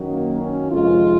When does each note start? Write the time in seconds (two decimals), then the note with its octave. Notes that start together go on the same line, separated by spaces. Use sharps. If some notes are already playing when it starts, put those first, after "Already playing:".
Already playing: F#2 D#3 F#3
0.11 A#3
0.41 C#4
0.70 F2 C3 D#3 G#3 F4